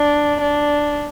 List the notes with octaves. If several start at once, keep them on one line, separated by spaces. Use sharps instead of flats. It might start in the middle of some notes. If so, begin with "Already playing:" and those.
Already playing: D4
D4